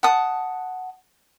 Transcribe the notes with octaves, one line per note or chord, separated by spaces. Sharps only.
F#5 A5 D#6